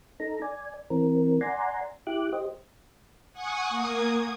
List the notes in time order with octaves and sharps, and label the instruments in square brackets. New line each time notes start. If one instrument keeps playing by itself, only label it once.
[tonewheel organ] D#4 A4 A#5
D5 G#5
E3 C4 A#4
D5 F#5 G#5 A#5 C6
E4 G4 D6 F#6
G4 C5 D#5
[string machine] F#5 G#5 C#6 D#6
A#3 D#6 G#6